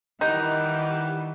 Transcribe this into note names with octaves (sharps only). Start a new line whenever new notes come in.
D#3 E3 G3 D#4 F#5